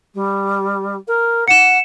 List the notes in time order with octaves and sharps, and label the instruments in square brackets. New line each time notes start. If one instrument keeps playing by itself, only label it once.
[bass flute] G3
A#4
[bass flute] F#5 [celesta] C#7 E7